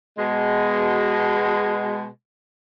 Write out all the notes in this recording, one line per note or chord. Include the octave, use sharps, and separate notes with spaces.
B2 G#3